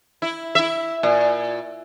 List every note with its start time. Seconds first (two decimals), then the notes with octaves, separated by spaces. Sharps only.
0.22 E4
0.55 E4 E5
1.03 A#2